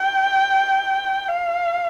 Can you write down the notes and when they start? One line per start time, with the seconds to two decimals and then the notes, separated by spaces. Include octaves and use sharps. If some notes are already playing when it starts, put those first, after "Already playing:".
Already playing: G5
1.28 F5